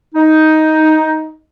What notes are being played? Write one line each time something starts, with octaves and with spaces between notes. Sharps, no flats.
D#4